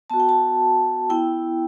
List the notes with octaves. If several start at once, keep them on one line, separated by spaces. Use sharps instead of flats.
B3 F#4 A5
G5
A5
B3 E4 G5